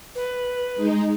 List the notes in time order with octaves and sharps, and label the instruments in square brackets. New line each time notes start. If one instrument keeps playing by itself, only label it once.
[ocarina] B4
[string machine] G#3 D#4